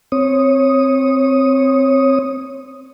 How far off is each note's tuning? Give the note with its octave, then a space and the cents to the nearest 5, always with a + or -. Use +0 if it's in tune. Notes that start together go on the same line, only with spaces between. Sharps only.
C4 +0 C#5 -15 D#6 +0